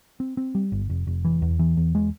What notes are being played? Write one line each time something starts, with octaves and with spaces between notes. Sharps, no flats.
C4
C4
G3
G1
F1
F1
E3
E2
E3
E2
G#3